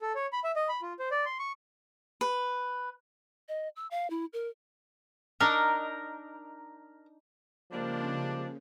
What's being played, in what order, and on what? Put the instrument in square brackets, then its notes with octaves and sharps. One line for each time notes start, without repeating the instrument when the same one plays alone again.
[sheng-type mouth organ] A4
C#5
B5
E5
D#5
B5
F4
C5
D5
C6
C#6
[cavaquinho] B4
[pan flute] D#5
E6
F5
E4
A#4
[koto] D4 D#4 [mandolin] A#4
[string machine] C#3 [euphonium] F3 [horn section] G3 G#3 D4 [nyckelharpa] A#3 C5